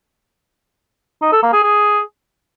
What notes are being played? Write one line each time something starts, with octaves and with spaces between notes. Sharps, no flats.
D#4
A4
A#3
G#4
G#4